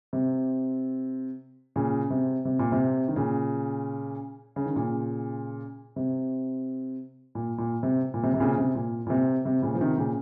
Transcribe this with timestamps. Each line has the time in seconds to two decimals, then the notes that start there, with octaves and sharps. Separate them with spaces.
0.13 C3
1.76 A#2 C#3
2.10 C3
2.45 C3
2.59 A#2
2.72 C3
3.08 D#3
3.16 A#2 C#3
4.56 C#3
4.65 D#3
4.76 A#2 C#3
5.96 C3
7.35 A#2
7.58 A#2
7.83 C3
8.14 A#2
8.23 C3
8.34 C3
8.40 A#2 C#3
8.58 C3
8.75 A#2
9.07 A#2
9.10 C3
9.45 C3
9.62 A#2 C#3
9.75 F3
9.80 C3 D#3
9.98 A#2 C#3